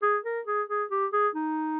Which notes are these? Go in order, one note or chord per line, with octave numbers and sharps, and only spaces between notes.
G#4
A#4
G#4
G#4
G4
G#4
D#4